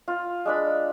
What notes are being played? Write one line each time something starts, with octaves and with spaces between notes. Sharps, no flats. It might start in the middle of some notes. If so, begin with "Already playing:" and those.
F4
G#3 D4 B5